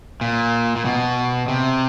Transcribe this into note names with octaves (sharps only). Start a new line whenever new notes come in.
A#2
A#2
B2
C3